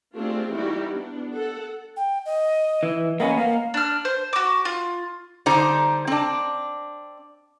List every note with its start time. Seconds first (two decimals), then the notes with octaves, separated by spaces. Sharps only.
0.16 A3 C4 D4 F4 G4 G#4
0.52 E3 G3 D#4 E4 F#4 G4
0.94 B3 D4
1.34 A4 F#5
1.97 G5
2.26 D#5
2.83 E3
3.20 A#3 B3 C#4 D#5
3.37 A#3 F5
3.74 D4 F6
4.05 C5
4.33 F#4 D6
4.65 F4
5.46 D3 G3 D#4 C5 A#5
6.07 C4 D4